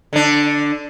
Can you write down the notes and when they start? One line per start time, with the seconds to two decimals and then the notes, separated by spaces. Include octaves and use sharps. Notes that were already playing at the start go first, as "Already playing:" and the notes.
0.13 D3 D4